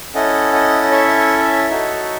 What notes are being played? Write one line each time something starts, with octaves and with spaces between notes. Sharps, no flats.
C#4 E4 A4 D#5 F#5
D#5 F#5
D#5
C#5 E5
D#4 F#4 A4